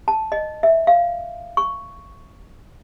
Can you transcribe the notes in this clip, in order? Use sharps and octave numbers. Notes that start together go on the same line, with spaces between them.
A5
D#5
E5
F5
C#6